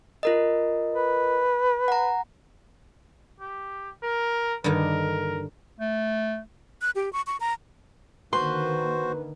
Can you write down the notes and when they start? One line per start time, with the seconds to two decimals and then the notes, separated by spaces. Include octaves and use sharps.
0.23 F4 A#4 D#5
0.95 B4
1.88 F#5 A#5
3.40 G4
4.03 A#4
4.64 G2 D3 D#3 A#4
5.80 A3
6.82 F#6
6.96 G4
7.13 C#6
7.27 C#6
7.40 A#5
8.33 D3 D#3 A#3 F#4 B4 C5 C6